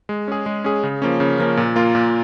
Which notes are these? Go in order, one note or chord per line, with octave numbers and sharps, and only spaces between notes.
G#3
C#4 G#4
G#3
C#4 G#4
C#3
F3 A#3 C#4
C#3
F3 A#3 C#4
A#2
A#3 F4
A#2